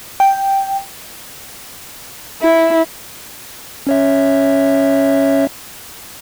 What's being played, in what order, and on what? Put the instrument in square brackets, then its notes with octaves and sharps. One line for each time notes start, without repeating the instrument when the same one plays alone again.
[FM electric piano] G5
[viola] E4
[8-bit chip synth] C#4 C#5 E5